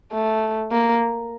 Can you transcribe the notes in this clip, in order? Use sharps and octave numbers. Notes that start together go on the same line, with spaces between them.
A3
A#3